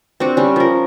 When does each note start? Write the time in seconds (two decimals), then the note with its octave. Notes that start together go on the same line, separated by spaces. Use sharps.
0.20 C4 D4 F#4
0.37 G3 C#4
0.56 F3 A#4